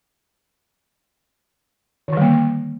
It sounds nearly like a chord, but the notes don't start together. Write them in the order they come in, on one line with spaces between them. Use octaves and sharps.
D#3 D3 G3 A#3